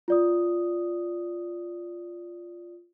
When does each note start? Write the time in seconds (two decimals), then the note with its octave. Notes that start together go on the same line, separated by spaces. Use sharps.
0.08 F4 D5 D#6